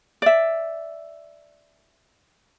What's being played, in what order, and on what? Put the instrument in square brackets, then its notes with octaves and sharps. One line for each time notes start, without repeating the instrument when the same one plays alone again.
[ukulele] D5 E5